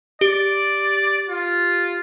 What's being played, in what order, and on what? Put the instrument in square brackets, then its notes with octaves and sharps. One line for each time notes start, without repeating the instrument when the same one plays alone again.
[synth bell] G4 [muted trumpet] D5
[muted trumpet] F4